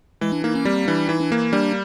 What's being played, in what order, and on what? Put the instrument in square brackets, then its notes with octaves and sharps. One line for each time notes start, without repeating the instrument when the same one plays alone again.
[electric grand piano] E3 [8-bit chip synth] G#3
[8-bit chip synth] D4
[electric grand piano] A#3 [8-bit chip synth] D#4
[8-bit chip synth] C#4
[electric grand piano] G3 [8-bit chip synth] C4
[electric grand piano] E3 [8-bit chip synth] D4
[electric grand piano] E3 [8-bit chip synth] D#4
[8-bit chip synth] D4
[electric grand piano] A#3
[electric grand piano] G3 [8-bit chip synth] D4